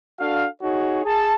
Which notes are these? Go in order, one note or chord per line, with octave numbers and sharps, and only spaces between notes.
D4 F#4 A4 F5
D#4 F#4 G#4 C#5
G#4 A5